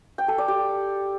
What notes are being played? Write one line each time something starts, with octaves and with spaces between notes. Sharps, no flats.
G5
A4
D5
G4